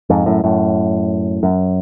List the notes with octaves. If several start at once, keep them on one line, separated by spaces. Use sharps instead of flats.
F2 G#2
F#2 A2
F#2 A2
F#2